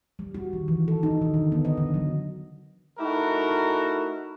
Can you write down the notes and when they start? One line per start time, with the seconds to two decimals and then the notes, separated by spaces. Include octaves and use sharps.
0.19 G3
0.35 F#4
0.53 D#3
0.68 E3
0.88 A4
1.03 D#4
1.22 D#3
1.34 D3
1.52 B3
1.65 D#5
1.77 D3
1.94 F#3
2.99 A3 D#4 E4 F#4 A#4